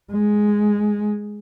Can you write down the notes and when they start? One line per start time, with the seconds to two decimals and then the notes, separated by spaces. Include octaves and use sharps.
0.12 G#3